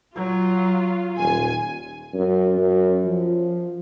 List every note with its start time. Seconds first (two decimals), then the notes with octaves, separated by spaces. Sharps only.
0.16 F#3 F4
1.18 D#1 G#5
2.14 F#2
2.57 F#2
3.05 F3